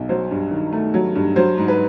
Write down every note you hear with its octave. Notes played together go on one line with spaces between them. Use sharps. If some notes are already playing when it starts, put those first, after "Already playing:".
Already playing: B1
F#3 C5
G2
D#3
A3
F#3
G2
F#3 C5
G#2
B4